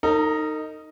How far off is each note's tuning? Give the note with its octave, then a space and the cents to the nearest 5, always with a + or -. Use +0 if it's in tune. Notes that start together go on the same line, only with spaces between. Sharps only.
D#4 +0 A#4 -45